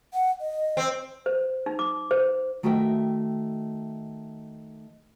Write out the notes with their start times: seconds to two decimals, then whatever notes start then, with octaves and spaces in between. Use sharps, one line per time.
0.13 F#5
0.41 D#5
0.77 C4
1.26 C5
1.66 D#4
1.79 D6
2.11 C5
2.63 D#3 A3 F#4 D#5 E5 G5